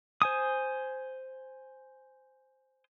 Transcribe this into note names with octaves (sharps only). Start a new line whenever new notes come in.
C5 G#5 D#6